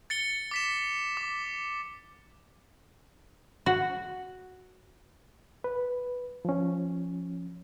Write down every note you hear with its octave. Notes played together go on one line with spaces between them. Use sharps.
A6 C#7 G7
D6 B6 E7
D6
F#4
B4
F3 C#4